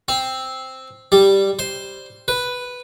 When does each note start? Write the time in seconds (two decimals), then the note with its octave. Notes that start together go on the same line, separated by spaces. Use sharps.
0.08 C4
1.12 G3
1.59 C5
2.28 B4